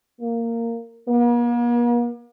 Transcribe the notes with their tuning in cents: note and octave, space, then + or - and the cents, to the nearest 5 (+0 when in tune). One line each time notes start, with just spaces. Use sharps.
A#3 -10
A#3 +45